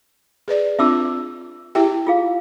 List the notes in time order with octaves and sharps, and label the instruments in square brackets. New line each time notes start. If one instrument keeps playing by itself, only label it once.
[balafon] G#4 B4 D5
[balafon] C4 D4 F4 [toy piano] E5 D6 E6
[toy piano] E4 G#4 [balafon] G4 E5 G5
[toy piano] F4 G#4 F5